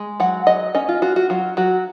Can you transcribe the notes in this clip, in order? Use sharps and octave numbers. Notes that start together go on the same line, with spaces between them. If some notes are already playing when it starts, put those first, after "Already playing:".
Already playing: G#3
F#3 F#5
F#3 D#5
C#4 D#5
F4
F4 F#4
F#4
F#3 F4
F#3 F#4